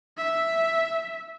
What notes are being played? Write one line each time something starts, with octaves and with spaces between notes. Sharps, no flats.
E5